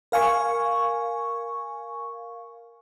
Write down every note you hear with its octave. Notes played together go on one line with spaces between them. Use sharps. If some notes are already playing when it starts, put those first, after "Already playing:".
A#4 F5 G#5 C#6